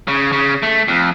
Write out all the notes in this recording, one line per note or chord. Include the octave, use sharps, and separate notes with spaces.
C#3
C#3
A3
F2